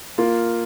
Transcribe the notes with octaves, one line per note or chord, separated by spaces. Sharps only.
A#3 F4